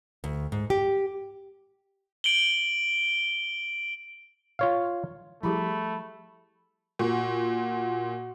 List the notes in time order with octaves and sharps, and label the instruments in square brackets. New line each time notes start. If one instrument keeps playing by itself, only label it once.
[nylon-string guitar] D2
G#2
G4
[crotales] D7 F#7 G7
[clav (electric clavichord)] F4 C#5 F5
[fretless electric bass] F3 G3 [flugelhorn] A3 [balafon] E4 G4 G#4 [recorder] B5
[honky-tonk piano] A#2 [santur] F#4